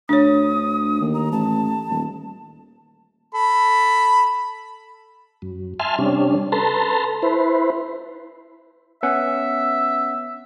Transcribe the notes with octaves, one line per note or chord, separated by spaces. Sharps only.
D2 D4 C#5 D#6
D#2
A#5
A1 A5
D#1
A4 B5
F#2
E5 G#5 A5 C6 F6
C3 G3 C#4 D4
A4 B4 A5 A#5 C6
E4 B4 C5
B3 C#4 E5 F#5